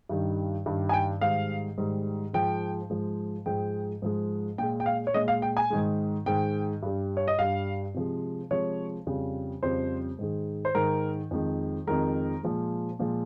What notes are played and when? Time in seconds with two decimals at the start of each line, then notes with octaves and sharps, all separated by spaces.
0.09 G2 D#3 G3
0.66 G2 D#3 G3
0.89 G#5
0.93 G5
1.21 G#2 D#3 G3 F5
1.78 G#2 D#3 G3
2.33 G#2 F3 G#3 G5
2.90 G#2 F3 G#3
3.46 G#2 F3 G#3 G5
4.02 G#2 F3 G#3
4.58 A#2 G5
4.63 G#3
4.80 G5
4.86 F5
5.07 C#5
5.14 A#2 G#3 D#5
5.28 F5
5.42 G5
5.57 G#5
5.70 G#2 D#3 G#3
6.26 G#2 D#3 G#3 G5
6.83 G2 G3
7.17 C#5
7.28 D#5
7.39 G2 G3 F5
7.94 C3 F3 G#3
8.51 C3 F3 G#3 C#5
9.07 F2 C#3 G3
9.63 F2 C#3 G3 C5
10.19 G#2 D#3 G#3
10.65 C5
10.75 G#2 D#3 G#3 A#4
11.31 F2 D#3 G#3
11.87 F2 D#3 G#3 A#4
12.43 A#2 F3 G#3
12.99 A#2 F3 G#3